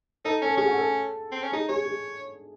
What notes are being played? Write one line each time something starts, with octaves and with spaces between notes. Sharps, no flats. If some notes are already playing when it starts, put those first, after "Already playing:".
D#4 A4
C#4 A4
C#4 G#4
F#4
A4
C4
C#4
D#4 G#4
G#4 C#5
G#4